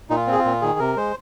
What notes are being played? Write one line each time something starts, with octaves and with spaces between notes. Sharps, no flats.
A#2 D#4
F4
C4 G#4
F4
A#2
D#3 G#4
C3 A#4
G#3 C5